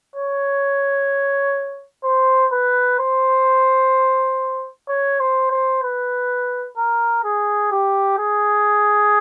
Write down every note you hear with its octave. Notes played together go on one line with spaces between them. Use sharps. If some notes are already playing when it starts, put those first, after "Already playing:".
C#5
C5
B4
C5
C#5
C5
C5
B4
A#4
G#4
G4
G#4